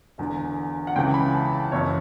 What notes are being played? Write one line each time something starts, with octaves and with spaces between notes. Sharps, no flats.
E1 E2 D3
F#5
C#2 C#3 E3 G5
B5
A5
A5
F#1 F#2 E3 C#5